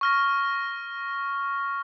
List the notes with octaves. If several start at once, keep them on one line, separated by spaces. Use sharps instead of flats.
C#6 F6 A#6